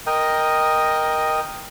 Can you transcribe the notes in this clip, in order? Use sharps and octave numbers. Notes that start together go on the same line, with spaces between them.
A#4 D#5 G5